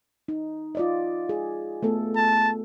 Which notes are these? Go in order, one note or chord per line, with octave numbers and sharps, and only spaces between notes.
D#4
F4 D5 D#5
G#4
A3 B3 A4
A5